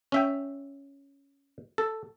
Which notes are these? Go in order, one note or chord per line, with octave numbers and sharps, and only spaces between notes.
C#4 E5 G5
A4